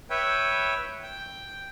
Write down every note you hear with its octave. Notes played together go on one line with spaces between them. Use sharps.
B4 C#5 E5 G5
G5